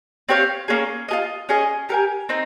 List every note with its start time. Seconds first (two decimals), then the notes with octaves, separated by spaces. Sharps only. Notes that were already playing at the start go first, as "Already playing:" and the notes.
0.29 C4 G4 C#5 F5
0.68 A#3 C#4 G#4
1.08 F4 G#4 D#5
1.49 C#4 G#4 D#5 G#5
1.89 G4 A#4 F5 G#5
2.29 C4 D#4